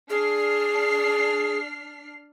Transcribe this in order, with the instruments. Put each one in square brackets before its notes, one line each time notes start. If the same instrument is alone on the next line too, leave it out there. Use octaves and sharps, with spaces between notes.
[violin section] D4 F6 C7 [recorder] G#4